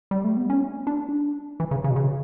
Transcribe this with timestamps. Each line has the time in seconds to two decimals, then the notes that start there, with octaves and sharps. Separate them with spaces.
0.11 G3
0.24 A3
0.37 B3
0.50 C#4
0.87 D4
1.60 E3
1.71 C#3
1.84 C#3
1.90 B2
1.96 C#3